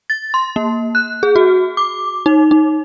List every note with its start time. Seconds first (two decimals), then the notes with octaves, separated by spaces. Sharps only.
0.10 A6
0.34 C6
0.56 A#3
0.95 F#6
1.23 G#4
1.36 F#4
1.77 D6
2.26 D#4
2.51 D#4